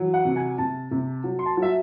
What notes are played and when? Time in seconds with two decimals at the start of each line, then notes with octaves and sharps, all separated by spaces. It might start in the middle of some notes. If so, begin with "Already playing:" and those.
Already playing: E3 F#3
0.14 F#5
0.25 C3
0.36 G#5
0.58 C3 A5
0.91 C3
1.24 F#3
1.39 C6
1.46 A5
1.57 F#3
1.62 E5